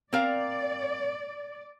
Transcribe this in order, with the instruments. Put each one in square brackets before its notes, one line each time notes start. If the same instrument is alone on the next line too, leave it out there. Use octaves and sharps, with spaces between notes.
[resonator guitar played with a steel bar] C4 A#4 F5 [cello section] D5